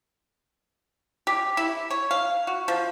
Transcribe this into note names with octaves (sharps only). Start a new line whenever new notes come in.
G4
E4
C#5
F5
F#4
F3